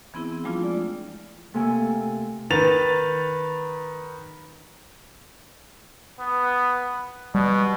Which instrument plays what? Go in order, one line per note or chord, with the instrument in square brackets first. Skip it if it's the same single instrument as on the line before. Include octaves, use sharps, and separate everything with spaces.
[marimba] E3 B3 C4 E4 G#4
F3 G3 A3 D4 E4 F4
G#3 D5
[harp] C3 A3 A#3 A4 G#5 E6
[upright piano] D#3 B4 A6 F7
[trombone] B3
[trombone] B2 [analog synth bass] G3